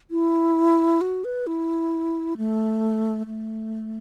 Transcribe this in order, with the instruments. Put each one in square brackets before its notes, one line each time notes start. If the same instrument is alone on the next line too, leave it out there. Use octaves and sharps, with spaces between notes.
[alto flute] E4
F#4
B4
E4
A3
A3